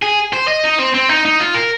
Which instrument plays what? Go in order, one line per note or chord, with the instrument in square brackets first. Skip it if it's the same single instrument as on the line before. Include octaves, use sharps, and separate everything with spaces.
[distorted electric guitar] G#4
C5
D#5
D#4
C4
C4
D#4
D#4
F4
A#4